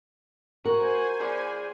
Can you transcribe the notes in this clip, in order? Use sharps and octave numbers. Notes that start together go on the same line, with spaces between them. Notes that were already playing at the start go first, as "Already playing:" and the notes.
F#4 A#4 C5 G#5
G#4 D5